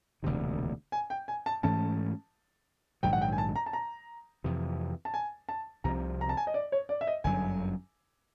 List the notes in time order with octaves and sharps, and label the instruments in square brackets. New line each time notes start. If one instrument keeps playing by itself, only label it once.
[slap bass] E1 D2 C3 D#3
[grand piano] G#5
G5
G#5
A5
[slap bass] G#2 E3 A3 C#4 [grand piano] A5
[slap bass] A#1 G#2 D#3 F#3 [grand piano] G5
[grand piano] F#5
G5
G#5
A5
A#5
A5
A#5
[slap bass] F2 C3 E3
[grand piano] A5
G#5
A5
[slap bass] C2 C3 F3 [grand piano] A#5
[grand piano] A#5
A5
G#5
D#5
D5
C#5
D5
E5
D#5
[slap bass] G1 F#2 D3 F#3 [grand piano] G#5